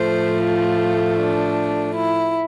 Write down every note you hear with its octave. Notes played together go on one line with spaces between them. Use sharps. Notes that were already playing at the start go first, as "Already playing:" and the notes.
Already playing: A2 F3 A3 C5
F4
D4
E4